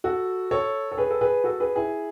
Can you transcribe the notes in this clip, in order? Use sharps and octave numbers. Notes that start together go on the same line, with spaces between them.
F#4 A4
A4 C#5
A4
G#4 B4
A4
G#4 B4
F#4 A4
G#4 B4
E4 G#4